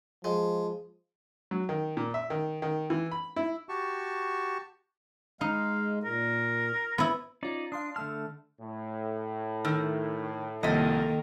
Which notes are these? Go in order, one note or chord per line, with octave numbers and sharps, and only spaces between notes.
F3 G#3
F#3
D#3
A#2
E5
D#3
D#3
E3
B5
E4
F#4 G4 A5 C#6
G#3 D#4 F5
A#2 A#4
B3 E4
C#4 D#4 F4 D5
D4 F5 C6 D#6
D3 A3 A5 E6 F6
A2
D#3 E6 F6
C2 D#3 F3 A#3 A4 D#5 B6